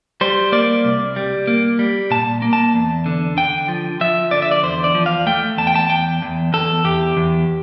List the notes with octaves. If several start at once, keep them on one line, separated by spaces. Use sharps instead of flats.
G3 C5
A#3 D5
C2
G3
A#3
G3
A#2 A5
A#3
A5
E2
D3
D3 G5
F3
F3 E5
D3 D5
E5
D5
E2 C5
D5
F3
F5
A3 G5
E2 A5
G5
A5
E2 G5
E2
E2 A4
E2 G4
E2